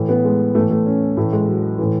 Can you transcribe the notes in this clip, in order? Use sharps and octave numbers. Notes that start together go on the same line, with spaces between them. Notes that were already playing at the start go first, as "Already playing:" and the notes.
Already playing: A2 E3
B3
G#3
A2 E3 A3
A3
C#4
A2 E3 A3
G#3
F#3
A2 E3